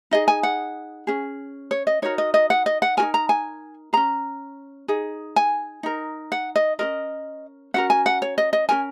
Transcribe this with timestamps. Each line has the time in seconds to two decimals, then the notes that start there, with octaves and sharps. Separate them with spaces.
0.11 D#4 G#4 D#5
0.28 G#5
0.43 F#5
1.07 C#4 G#4
1.71 C#5
1.87 D#5
2.02 D#4 F#4 A#4 C#5
2.18 D#5
2.34 D#5
2.50 F#5
2.66 D#5
2.82 F#5
2.97 F#4 A#4 G#5
3.02 D#4
3.14 A#5
3.29 G#5
3.93 C#4 G#4 A#5
4.88 D#4 G#4
5.36 G#5
5.83 D#4 A#4
6.32 F#5
6.56 D#5
6.79 C#4 F#4 A#4 D#5
7.74 C#4 F#4 A#4 F#5
7.90 G#5
8.06 F#5
8.22 C#5
8.38 D#5
8.53 D#5
8.69 C#4 F#4 A#4 G#5